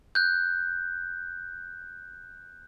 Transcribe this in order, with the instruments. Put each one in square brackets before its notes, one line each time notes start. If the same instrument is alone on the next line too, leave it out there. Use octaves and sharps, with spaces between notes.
[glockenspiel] F#6 G6